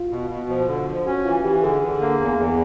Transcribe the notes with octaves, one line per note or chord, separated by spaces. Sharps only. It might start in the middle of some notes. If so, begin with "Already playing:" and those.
Already playing: F4
B2
B2
F3
D3
F3
C#4 F#4
E3 F4
E3 G4
D3 G#4
D3
A#3
E2
E2